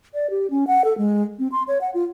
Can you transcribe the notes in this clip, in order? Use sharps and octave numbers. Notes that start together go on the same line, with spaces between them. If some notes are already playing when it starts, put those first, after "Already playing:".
D5
G4
C#4
F#5
A4
G#3
C4
C6
C#5
F#5
F4